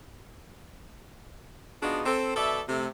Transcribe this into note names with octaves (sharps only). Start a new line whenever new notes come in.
B3 D4 D#4 F4 F#4 G#4
C4 A4
B2 A4 D5 E5
C3 A3